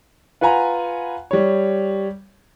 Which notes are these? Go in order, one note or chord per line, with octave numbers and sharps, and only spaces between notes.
F4 B4 F#5 G#5 A#5
G3 C#5